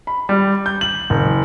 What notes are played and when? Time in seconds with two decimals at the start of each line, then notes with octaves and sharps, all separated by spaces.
0.07 B5
0.29 G3
0.66 G6
0.81 F#7
1.10 F#1